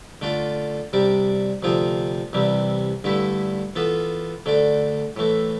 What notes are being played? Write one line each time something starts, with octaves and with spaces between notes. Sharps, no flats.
D3 A3 D4 F4
C3 G3 D4
D2 C3 F3 C4 F4
C2 C3 E3 G3
G2 D3 A3 E4
E3 B3 F4 A4
D2 D3 A3 D4
A2 E3 A3